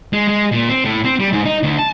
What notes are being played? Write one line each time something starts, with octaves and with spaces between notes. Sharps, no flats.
G#3
G#3
A#2
C4
A2
C4
G3
G#2
D#4
D2
A5